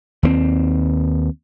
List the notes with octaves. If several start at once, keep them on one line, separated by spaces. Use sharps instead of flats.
D#2 A3 C4